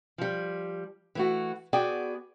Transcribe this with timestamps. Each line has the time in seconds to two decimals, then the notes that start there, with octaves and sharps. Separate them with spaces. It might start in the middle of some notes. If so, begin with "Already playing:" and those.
0.18 F3 G3
1.15 E3 A3 F#4
1.73 B3 F#4 G#4 D5 G5